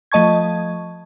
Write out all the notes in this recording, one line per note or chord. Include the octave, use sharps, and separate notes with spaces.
F3 A3 D#5 A5 C#6 G#6